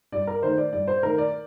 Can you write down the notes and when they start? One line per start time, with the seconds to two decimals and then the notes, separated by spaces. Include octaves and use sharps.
0.12 G2 D5
0.27 A#4
0.42 D#3 A3 C5
0.58 D5
0.72 G2 D5
0.88 C5
1.03 D#3 A3 A#4
1.18 D5